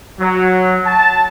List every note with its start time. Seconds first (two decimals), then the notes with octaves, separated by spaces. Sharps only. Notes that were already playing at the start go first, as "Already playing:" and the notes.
0.19 F#3
0.85 A5